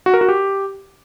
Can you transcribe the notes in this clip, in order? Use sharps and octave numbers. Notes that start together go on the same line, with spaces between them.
F#4
A#4
F#4
G4